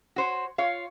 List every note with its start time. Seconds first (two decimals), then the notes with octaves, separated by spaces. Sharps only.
0.16 F#4 C5 C#5
0.58 F4 C#5 F5